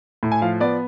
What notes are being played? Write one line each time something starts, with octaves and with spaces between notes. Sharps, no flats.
A2
G#5
F3 F5
B3 D5